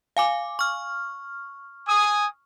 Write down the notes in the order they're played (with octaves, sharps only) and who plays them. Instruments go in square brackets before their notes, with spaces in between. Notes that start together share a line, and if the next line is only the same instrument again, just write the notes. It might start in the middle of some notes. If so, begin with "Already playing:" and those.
[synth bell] F5 G#5 D6
C#6 F6
[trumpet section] G#5 D#6